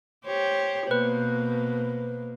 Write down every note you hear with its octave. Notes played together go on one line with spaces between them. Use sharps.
G4 C5 C#5
B2 A#3 B4 C5